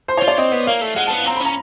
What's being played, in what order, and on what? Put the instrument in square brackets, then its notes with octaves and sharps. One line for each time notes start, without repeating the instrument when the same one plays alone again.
[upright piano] C5
C#5
[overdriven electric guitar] F4
[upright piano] D5
[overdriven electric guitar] C4 [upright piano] D#5
[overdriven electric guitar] B3
[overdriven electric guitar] A#3 [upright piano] F5
[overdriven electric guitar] A3
[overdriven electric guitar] G#3 [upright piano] F#5
[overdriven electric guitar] B3 [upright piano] A5
[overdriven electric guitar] C4 [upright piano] A#5
[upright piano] B5
[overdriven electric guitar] C#4 [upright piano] A#5